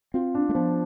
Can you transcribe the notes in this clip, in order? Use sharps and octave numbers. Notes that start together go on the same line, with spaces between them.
C4 F4
D4
A3
F3 B3